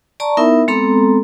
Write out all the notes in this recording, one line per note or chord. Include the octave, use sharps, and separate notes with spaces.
D5 A5 A#5 C#6
B3 D#4 E4 A#4 E5
G#3 B3 C4 A4 A#5 C6